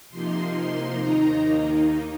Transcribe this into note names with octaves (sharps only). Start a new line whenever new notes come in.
C3 F3 A#3 D#4 C6
D#2 D#3 A#3 D#4 A#5